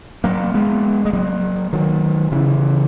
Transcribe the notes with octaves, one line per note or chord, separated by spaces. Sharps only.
F#3 A#3
G#3 B3
G#3
F#3 A#3
D#3 F#3
C#3 E3